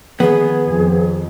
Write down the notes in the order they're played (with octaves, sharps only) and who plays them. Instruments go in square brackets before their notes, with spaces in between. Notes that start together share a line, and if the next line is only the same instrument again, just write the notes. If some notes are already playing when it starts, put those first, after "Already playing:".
[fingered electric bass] D#3 F3 [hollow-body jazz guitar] B3 [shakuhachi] G#4
[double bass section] F2